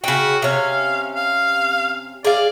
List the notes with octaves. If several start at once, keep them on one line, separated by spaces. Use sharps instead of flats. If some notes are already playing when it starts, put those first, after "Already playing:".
C#3 F#4 G5
C3 C#4 F5
F5
G#4 D5 F5